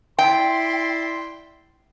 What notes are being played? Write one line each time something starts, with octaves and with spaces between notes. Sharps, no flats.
E4 D5 G5 C6